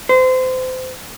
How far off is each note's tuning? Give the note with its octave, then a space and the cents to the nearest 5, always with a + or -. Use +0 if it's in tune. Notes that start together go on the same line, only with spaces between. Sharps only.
C5 -30